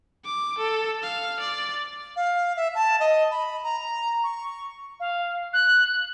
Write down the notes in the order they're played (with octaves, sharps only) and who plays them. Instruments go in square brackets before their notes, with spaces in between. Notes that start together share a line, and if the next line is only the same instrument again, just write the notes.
[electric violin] D6
A4
F5
D5
[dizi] F5
E5
A5
D#5
B5
A#5
C#6
[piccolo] F5
F#6